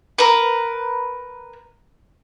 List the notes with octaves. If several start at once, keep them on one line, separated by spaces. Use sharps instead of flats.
A#4 B4